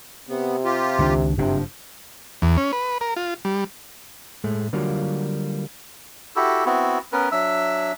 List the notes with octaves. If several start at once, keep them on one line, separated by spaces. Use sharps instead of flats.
C3 B3
F4 G4
C#2 D#3 D4
F#1 G2 C3 F3 D4
E2
C#4
B4
A#4
F4
G3
A2 G#3 A3
D3 F#3 G3 A#3 F4 F#4
E4 F#4 G4 A4
B3 C4 E4 F#4
B3 C#4 A#4 B4
F#3 D4 E5 E6